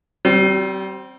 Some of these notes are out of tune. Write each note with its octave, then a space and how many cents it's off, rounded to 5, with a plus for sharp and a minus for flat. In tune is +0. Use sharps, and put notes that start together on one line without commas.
G3 -35 C4 +0